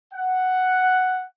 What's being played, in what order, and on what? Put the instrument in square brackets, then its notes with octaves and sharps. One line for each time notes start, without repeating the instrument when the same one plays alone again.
[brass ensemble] F#5